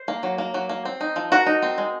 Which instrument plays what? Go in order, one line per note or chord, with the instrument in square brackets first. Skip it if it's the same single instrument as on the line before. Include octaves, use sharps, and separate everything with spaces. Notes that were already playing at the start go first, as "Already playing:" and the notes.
Already playing: [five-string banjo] C5
A#3
F#3
A#3
F#3
A#3
C4
D#4
F3
F3 F#4 A#4
D#4
C4
G#3